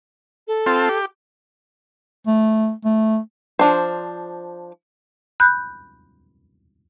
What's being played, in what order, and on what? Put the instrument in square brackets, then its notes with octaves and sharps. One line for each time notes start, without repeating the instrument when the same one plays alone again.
[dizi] A4
[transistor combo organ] C4 F4 A5
G4
[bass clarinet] A3
A3
[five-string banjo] F3 D4 C5
[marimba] B5 F#6 G6